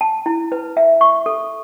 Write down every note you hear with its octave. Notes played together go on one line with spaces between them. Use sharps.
A5
E4
B4
E5
C#6
A4